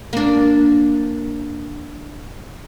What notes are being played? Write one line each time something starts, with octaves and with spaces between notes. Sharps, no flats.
A#3 D4